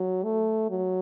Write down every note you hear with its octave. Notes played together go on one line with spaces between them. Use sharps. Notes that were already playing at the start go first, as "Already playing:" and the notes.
Already playing: F#3
A3
F#3